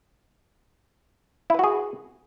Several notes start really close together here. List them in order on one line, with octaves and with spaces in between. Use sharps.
E4 B4 F#4 G#4